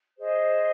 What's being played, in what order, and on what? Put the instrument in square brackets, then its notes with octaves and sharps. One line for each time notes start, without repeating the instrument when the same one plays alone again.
[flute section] G#4 C5 D#5